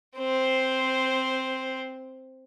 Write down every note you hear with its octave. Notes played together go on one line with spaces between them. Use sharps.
C4 C5